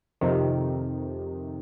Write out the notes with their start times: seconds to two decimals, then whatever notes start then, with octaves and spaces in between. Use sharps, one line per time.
0.21 F2 C3 D#3